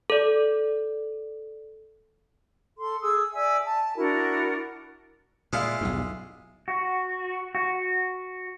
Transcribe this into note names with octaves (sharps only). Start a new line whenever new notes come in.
A4 D5
A4 C6
G#4 D#6 E6
D5 E5 G#5 E6
A5
D4 E4 F#4 A#4
A#2 G#3 E4 F4
B1 E2 G2
F#4
F#4